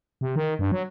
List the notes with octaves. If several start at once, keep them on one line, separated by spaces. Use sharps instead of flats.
C3
D#3
G2
F#3